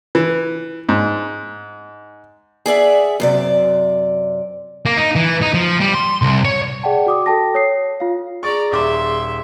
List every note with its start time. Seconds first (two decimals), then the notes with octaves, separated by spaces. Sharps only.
0.15 E3
0.89 G#2
2.66 G#4 D5 E5 F#5
3.20 F#2 C3 D5
4.86 A#3
4.97 D#4
5.16 E3
5.42 D#4
5.54 F3
5.80 G3
5.94 C6
6.22 C2
6.45 C#5
6.83 G#4 D5 F#5 G5 A5
7.07 F#4 D6 D#6
7.26 F#4 A4 G5 A5 A#6
7.55 C#5 D#6 C7
8.00 F4 F5
8.43 G#4 D5 A#5 C#6
8.72 D#1 E5 C6 D6